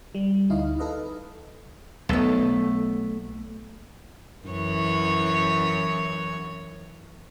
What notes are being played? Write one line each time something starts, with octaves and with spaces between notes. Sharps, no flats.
G3
D2 D#4 E4 D#5 F5
D#4 A4 B4 D#5 F5
B1 A3 B3
F#2 E3 C#5